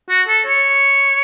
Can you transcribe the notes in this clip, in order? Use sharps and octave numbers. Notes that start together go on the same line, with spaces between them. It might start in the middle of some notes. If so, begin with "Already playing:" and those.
F#4
A4
C#5